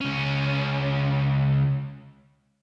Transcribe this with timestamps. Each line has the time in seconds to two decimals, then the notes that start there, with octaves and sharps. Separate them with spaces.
0.01 C#2 C#4